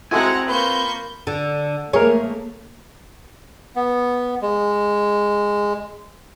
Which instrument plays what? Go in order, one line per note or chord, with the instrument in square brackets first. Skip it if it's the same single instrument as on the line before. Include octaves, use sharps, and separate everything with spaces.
[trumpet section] G#3 [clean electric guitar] C4 G#5 [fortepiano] E4 F#4 A4 [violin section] F#5 A#5
[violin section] A#3 C#6 G6 [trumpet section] F4 B5 [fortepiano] B4
[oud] D3
[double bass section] A3 A#3 [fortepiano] G#4 A#4 [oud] C#5
[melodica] B3
G#3